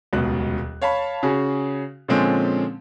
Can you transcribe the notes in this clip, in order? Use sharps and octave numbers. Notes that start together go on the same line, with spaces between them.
D#1 C#2 B2 F#6
C#5 F5 A5 B5
C#3 C#4 F#4 G#4
A#2 D3 F3 G#3 C4 C#4